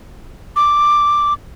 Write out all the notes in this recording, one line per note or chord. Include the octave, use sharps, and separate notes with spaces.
D6